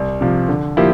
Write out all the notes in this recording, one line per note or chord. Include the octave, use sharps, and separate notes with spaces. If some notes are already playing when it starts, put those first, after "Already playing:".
Already playing: C2
C3 F3
D3
F3 A#3 E4 G4